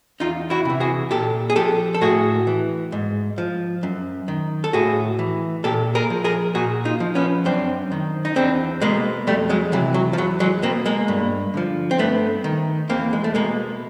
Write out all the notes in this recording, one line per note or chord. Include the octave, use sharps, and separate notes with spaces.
E2 D#4 F4
E4 F#4
C3 E3
F#4 G#4
A#2 G4 A4
G#4
F3 G4 A4
A4
A2 F#4 G#4
E3
G#2
F3
F#2
D#3
A4
A2 F#4 G#4
E3
A#2 G4 A4
G#4 A#4
F3
G#4 A#4
A#2 F#4 G#4
D#4 F4
F3
B3 C#4
F#2 C4 D4
D#3
D#4
E2 C4 D4
B2 G#3 A#3
F2 G3 A3
F#3 G#3
C3 E3 F#3
F#3
F3
E2 F#3
F#3 G#3
B2 A#3 C4
G#3 A#3
G2
D3 F3
C4
G2 A3 B3
D#3
E2 A#3 C4
G#3
A3
B2 G#3 A#3